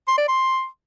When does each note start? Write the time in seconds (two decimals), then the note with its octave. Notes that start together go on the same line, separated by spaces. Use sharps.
0.08 C6
0.18 D5
0.28 C6